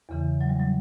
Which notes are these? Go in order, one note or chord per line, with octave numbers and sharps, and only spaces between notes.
E2 C#3 E3
F#3
G3
F#3